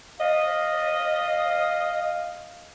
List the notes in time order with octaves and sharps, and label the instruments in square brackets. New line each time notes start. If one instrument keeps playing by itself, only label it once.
[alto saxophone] D#5 [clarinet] F5